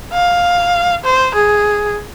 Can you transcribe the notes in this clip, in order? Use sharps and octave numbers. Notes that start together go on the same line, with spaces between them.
F5
C5
G#4